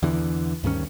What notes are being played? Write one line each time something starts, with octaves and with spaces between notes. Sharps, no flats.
E2 D3 E3
D2 G2 D#3 C#4